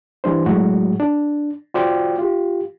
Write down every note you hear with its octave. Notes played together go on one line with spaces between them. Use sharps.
E3 G3 D4 C5
A2 F#3 G#3 F#4
D4
F4 F#4 C5 D5 G5
F4 G4